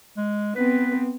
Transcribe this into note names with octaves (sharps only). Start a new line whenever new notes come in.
G#3
B3 C4 B4